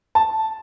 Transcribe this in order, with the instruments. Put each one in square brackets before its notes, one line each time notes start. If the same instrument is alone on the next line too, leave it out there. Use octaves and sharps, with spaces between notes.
[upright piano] A5